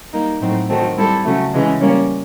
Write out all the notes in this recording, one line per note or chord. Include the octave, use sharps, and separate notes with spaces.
G3 A#3 D#4
A2 F#3 A3 C4 D#4
D#3 F#3 A3 C4
G3 C4 E4 A4
C#3 F#3 A3
C#3 E3 G#3
G3 A#3 C#4